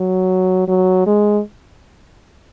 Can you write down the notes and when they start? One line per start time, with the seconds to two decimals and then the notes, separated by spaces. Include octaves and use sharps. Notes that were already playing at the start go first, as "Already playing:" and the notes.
Already playing: F#3
0.68 F#3
1.07 G#3